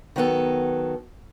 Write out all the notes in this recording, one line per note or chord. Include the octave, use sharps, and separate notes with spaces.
D#3 F#3 B3 A4